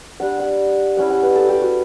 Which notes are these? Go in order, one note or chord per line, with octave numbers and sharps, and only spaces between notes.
G3 D4 F#5
F#5
G3 C#4 E4 F#5
F#5
B4
A4
G4
F#4